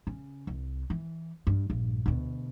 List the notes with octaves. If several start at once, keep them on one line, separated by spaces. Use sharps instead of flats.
C#3
C2
E3
G2
A#1 G2
D2 B2